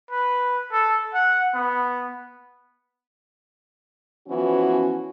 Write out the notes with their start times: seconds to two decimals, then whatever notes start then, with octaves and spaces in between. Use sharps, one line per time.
0.11 B4
0.72 A4
1.14 F#5
1.55 B3
4.28 E3 F3 B3 C#4 F#4